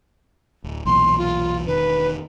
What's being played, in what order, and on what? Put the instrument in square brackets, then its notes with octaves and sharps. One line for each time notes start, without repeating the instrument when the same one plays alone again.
[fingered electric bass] D1
[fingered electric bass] B1 E2 A#2 [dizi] C6
[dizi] F4
[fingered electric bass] E1 D#3 [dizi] B4